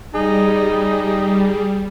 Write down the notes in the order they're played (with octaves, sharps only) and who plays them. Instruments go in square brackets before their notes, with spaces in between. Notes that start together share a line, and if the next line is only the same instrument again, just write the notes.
[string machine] G3 [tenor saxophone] D#4 [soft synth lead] G#4